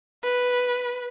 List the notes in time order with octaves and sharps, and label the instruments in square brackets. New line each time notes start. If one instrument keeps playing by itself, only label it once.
[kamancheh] B4